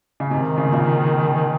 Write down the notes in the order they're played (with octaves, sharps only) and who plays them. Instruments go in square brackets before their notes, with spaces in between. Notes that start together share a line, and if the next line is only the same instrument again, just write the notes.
[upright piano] C#3
[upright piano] G#2 C3 [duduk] D#3
[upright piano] C#3
C3
A#2 C#3